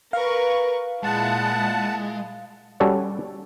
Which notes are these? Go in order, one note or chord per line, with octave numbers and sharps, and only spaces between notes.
A#4 B4 F5 C#6
A#2 G#3 E4 F#5 A5
G3 C#4 F#4 A4 C#5 D5